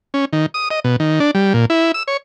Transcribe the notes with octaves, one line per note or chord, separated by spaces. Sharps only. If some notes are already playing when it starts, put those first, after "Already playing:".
C#4
D#3
D#6
D#5
B2
D#3
D4
G3
A#2
E4
E6
C#5